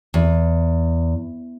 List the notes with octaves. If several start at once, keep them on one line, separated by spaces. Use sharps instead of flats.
E2